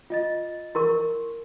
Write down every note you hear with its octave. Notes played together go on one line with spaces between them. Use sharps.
F4 D#5 A6
E4 A#4 C6 C#6